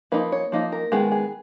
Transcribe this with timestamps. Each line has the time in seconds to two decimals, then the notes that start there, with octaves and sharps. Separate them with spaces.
0.12 F3 A#3 D#4 B4
0.32 C#5
0.52 F3 A#3 D#4
0.72 A#4
0.92 D#3 G#3 B3 G#4
1.12 G#4